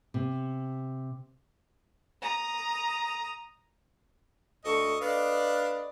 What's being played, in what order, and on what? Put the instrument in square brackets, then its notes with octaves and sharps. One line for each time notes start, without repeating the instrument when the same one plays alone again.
[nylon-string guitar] C3
[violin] A#5 D#6
[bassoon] D2 [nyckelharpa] A4 C#6 [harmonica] D#5
[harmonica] D4 F5 [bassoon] B4 [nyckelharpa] D5 D#5